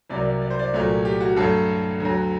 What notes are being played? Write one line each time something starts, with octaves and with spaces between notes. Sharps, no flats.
C2 C3 F#3 A#3 D5
D5
D5
C5
D5
C2 A#2 F#3 A3
G4
F#4
G2 F#3 A3 A4
D2 D3 F#3